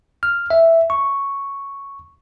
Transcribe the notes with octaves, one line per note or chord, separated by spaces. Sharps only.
F6
E5
C#6